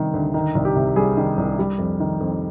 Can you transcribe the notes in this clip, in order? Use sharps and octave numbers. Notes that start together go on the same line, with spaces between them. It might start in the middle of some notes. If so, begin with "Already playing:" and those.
Already playing: C3 D#3 G3
D2
D#3
C2
G4
C3
G3 G#4
D#3
C2
G3
F2
D#3
F2